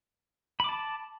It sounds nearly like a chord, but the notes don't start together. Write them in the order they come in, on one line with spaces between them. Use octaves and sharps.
B5 D6 A5